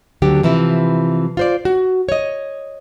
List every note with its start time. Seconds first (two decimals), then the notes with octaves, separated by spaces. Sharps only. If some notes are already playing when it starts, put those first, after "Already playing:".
0.22 D2 D3 F#3 G4
0.43 C3 E3 F3 E4
1.37 F4 C5 D5
1.65 F#4
2.09 C#5 D#5